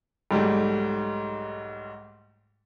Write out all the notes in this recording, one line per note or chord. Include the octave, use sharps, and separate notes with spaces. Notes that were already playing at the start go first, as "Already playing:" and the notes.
B1 G#2 G3 A3